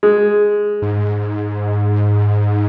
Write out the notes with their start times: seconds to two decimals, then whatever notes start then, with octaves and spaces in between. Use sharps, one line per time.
0.03 G#3
0.82 G#2